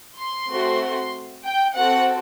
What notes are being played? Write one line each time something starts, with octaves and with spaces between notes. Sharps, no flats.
C6
A3 C4 F#4
G5
C4 F#4 A4 F#5